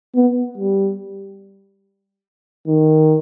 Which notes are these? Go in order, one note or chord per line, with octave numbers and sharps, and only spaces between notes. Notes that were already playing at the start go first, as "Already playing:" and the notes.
B3
G3
D#3